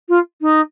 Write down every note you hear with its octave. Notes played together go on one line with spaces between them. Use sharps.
F4
D#4